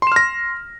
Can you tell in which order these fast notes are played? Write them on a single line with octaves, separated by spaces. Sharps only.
C6 E7 F6 A#6